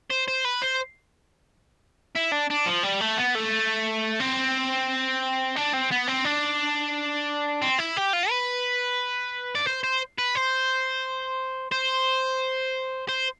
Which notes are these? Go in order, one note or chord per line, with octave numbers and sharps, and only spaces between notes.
C5
C5
B4
C5
E4
D4
D4
F3
G3
A3
B3
A3
C4
D4
C4
B3
C4
D4
C4
E4
G4
F4
B4
D5
C5
C5
B4
C5
C5
C5